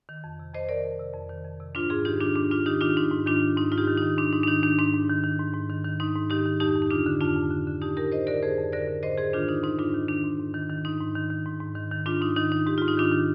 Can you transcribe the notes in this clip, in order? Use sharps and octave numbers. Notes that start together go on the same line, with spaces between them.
D#3
F2
C3
F2 C5 D#5
D#3 A#4 D5
F2
C3
F2
D#3
F2
C3
G#2 D4 F4
G#2 F4 G#4
D#3 D#4 G4
D#3 D4 F4
G#2 D4
G#2 D4 F4
D#3 D#4 G4
D#3 D4 F4
G#2 D#4
G#2
D#3 D4 F4
D#3
G#2 D#4
G#2 F4
D#4 G4
D#3
D#3 D#4
G#2 D4
G#2 D#4
D4
D#3 D#4
D#3 D4
G#2 D4
G#2
D#3
D#3
G#2
G#2
D#3
D#3
G#2 D#4
G#2
D#3 D#4 G4
D#3
F2 D#4 G4
F2
D#4
D3 D4 F4
D3
F2 D4 F4
F2
D3
D3
F2 D#4 G4
F2 G4 A#4
D3 C5 D#5
D3 A#4 D5
F2 G#4 C5
F2
D3 A#4 D5
D3
G#2 C5 D#5
G#2 G#4 C5
D#3 D4 F4
D#3 D#4
G#2 D#4
G#2 D4 F4
D#3
D#3 D4
G#2
G#2
D#3
D#3
G#2 D#4
G#2
D#3
D#3
G#2
G#2
D#3
D#3
G#2 D4 F4
G#2 D#4
D#3 D#4
D#3 D#4
G#2 G4
G#2 F4
D#4
D#3 D4 F4
D#3